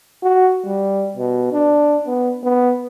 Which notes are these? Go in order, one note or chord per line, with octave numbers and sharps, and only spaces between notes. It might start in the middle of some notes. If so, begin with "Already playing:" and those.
F#4
G3
B2
D4
B3
B3